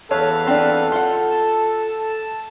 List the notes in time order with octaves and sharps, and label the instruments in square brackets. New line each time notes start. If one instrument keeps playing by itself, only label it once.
[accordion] E2 B4 F5 [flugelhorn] A4 [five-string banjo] C#5 A5
[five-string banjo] C4 D4
[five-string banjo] F4 F#5 [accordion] G6
[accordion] A5